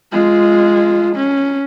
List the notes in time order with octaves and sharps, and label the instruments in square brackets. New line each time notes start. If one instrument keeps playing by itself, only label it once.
[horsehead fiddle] G#3 F4
C#4